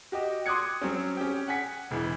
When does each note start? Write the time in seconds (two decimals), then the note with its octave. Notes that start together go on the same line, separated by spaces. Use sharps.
0.12 F#4 G4 D#5
0.46 C6 D6 D#6 F#6 G#6 C#7
0.81 F#3 C4 C#4
1.17 C#4 G4 G5
1.48 F#5 G#5 B6 C#7
1.91 E1 E3